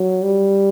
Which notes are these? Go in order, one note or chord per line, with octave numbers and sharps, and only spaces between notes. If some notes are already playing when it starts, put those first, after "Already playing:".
Already playing: F#3
G3